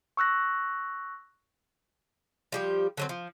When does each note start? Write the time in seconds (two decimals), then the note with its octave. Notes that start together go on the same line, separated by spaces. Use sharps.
0.17 C#6 E6 F#6 A#6
2.52 F3 G3 G4
2.97 D3 F#3 C4
3.09 F3